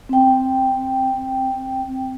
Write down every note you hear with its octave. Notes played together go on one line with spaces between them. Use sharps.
C4 G5